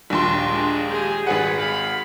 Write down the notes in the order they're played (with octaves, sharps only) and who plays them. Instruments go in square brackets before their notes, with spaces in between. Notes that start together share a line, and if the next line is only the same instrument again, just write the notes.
[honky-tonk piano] A#1 D#2 C6 [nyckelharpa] D4
[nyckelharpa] G#3 D4
G4 G#4
[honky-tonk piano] G#1 G#4 F#5 [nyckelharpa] B4
[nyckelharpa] F5 B5